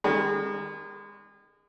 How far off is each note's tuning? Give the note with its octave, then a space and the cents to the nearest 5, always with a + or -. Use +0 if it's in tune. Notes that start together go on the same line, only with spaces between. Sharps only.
D#3 +0 G#3 -40